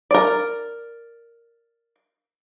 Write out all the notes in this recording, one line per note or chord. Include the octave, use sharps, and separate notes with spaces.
A#4 D5